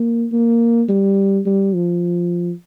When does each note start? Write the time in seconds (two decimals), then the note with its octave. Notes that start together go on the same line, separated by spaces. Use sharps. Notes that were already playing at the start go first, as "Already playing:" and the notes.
Already playing: A#3
0.32 A#3
0.89 G3
1.46 G3
1.75 F3